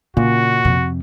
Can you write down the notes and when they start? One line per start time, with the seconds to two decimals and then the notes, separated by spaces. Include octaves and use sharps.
0.17 A#2 C#3 F#4
0.65 F2 C3